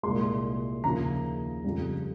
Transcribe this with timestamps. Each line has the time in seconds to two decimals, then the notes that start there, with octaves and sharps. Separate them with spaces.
0.03 C2 A#2 G#3 C6
0.84 D#2 C#3 F3 A#3 A#5
1.64 F2 C#3 G3